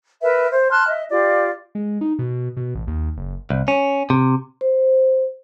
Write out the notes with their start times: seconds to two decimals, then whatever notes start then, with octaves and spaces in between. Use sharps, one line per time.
0.21 A#4 B4 E5
0.51 C5
0.71 A5 C6 F6 F#6
0.87 D#5 E5
1.11 F4 G4 D5
1.75 G#3
2.01 D#4
2.19 B2
2.57 B2
2.75 A1
2.87 D#2
3.17 F#1
3.50 C2
3.68 C#4
4.10 C3
4.61 C5